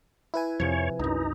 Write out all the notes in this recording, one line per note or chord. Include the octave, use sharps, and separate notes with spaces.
E4 B4 G#5
F2 C3 F3 C#5
C2 F#2 D#4